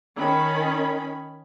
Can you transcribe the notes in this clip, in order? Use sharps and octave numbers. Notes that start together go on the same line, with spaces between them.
D#3 C#4 B5